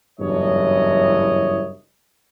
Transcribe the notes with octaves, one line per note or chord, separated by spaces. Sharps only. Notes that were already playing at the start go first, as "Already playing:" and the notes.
F#1 E2 G2 E4 C#5 D#5